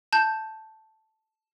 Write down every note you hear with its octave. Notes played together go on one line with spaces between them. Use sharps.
A5 G6